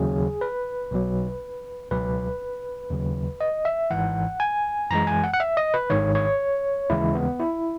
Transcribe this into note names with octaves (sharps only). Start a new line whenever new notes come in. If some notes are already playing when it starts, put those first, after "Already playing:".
Already playing: D#2 C#3 F#3 G#4
B4
B1 B2 F#3
C#2 B2 F#3 B4
D#2 C#3 F#3
D#5
E5
G#1 G#2 E3 F#5
G#5
F#2 E3 G#3 A#5
G#5
F#5
F#5
E5
D#5
B4
G#1 G#2 D#3 C#5
C#5
D#2 C#3 E3 G#3 E4
B3
E4